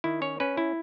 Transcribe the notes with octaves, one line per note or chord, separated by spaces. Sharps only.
D#3 E4
C#4 C#5
C#4 B4
E4